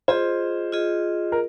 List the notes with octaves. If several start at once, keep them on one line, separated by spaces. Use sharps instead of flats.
F4 G#4 C5 D#5
F4 G#4 D#5
A#4